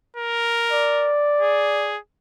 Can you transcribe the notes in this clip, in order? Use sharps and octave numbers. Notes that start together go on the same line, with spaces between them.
A#4
D5
G#4